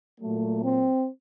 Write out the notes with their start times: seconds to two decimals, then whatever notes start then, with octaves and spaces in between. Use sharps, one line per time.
0.20 A#2 F#3 A3
0.62 C4